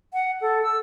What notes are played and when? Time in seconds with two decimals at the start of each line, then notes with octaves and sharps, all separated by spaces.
0.13 F#5
0.41 A4
0.63 E6